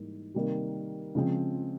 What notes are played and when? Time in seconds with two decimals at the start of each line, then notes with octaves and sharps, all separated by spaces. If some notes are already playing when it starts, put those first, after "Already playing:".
Already playing: G#2 E3 G3 A#3
0.34 C3 D#3 G3 A#3
1.15 C#3 F3 G#3 C4